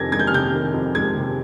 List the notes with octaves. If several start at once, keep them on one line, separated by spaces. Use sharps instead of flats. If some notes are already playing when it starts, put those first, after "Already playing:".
Already playing: F2 C3 D#3 G#6 A#6
G#3 G#6
G6
F6
C3 G6
D#3
F2
G#3 G#6
C3